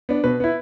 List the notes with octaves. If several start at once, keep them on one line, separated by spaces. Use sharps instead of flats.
B3 D4
B2 B4
B3 E4